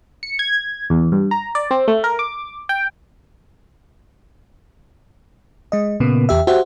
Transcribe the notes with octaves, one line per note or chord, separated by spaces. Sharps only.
C#7
G#6
E2
G2
A#5
D5
C4
A3
A#4
D6
G5
G#3 D#5
A#2 C#3 A#3 B3
E2 G4 E5
F#4 G4 C5 E5 F#5